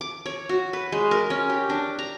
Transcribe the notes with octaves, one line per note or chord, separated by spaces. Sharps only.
D6
C#5
F#4
B4
G#3
A#4
C#4
G4
D4
A#5